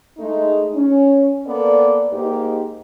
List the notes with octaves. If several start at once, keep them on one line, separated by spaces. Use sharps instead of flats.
G#3 A3 D#4
C#4
A#3 B3 A4 D5
G#2 A#3 D#4 G4